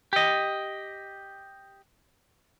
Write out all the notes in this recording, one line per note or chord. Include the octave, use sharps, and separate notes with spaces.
G4 D#5